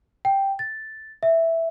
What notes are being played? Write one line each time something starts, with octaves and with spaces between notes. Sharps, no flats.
G5
A6
E5